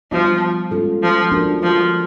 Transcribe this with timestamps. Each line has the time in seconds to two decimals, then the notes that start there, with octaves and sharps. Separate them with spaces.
0.12 F3 G3 B3 D4 F4
0.71 G#3 C#4 F4 A4
1.02 F3
1.32 A#3 D4 F#4 A#4
1.63 F3